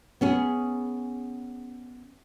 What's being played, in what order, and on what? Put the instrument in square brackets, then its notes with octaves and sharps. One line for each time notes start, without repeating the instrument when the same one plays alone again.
[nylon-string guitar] B3 C#4 G#4